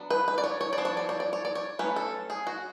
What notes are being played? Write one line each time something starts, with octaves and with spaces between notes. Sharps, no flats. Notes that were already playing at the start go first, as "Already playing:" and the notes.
Already playing: F#3 B3 D4
B4
B4
D5
C#5
C#5
D5
F3 B3 D4
C#5
D5
C#5
D5
C#5
D5
C#5
F#3 A3 C#4 B4
A4
G#4
F#4